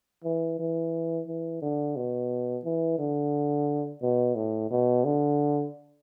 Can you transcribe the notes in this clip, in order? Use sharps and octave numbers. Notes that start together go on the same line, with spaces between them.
E3
E3
E3
D3
B2
E3
D3
B2
A2
B2
D3